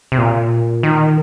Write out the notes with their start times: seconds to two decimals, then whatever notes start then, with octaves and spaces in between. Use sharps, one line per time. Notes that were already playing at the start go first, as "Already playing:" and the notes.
0.12 C3
0.18 A#2
0.83 D#3